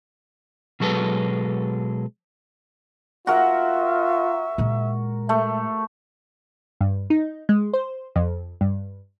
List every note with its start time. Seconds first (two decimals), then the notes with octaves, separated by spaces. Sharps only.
0.80 B2 F#3 G#3 A4 B4
3.27 F4 F#4 A#4 E5
4.58 A#2 G#3
5.29 A3 E5
6.81 G2
7.10 D#4
7.49 G#3
7.73 C5
8.16 F2
8.61 G2